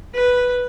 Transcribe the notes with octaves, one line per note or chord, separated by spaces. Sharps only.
B4